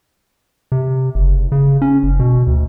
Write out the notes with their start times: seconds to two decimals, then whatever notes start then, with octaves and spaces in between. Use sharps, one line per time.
0.72 C3
1.15 F#1
1.35 F#1
1.52 C#3
1.82 C#4
2.03 F#1
2.20 B2
2.47 D2